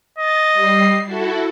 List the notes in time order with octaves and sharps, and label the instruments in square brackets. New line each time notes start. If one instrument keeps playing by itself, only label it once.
[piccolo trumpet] D#5 [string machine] A6
[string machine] G3 C7
E4 F#4 A4